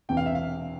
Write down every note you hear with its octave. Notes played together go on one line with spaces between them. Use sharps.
E1 E2 C3 E3 G5
F5
E5
F5